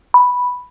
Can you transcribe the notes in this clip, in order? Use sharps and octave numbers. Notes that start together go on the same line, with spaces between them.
B5